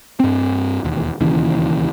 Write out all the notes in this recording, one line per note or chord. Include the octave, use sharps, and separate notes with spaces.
G2 C4
E1 D#2
E1 D#2 C#3 E3